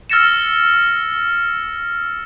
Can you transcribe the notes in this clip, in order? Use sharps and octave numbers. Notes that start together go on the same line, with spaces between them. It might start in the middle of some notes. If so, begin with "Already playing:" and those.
E6 F6 A6 A#6 C#7 E7